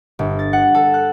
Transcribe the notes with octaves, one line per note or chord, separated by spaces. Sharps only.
G1
A6
F#5
A4
F#6